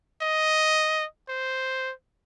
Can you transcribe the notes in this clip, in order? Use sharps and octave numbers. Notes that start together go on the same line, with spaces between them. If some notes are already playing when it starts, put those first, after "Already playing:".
D#5
C5